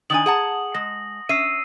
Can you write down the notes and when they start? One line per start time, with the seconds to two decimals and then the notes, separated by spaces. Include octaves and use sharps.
0.10 D#3 D4 G#5 D#6 F#7
0.26 G#4 F#5 A5
0.74 G#3 A#6
1.29 C#4 E5 E6 C7 D#7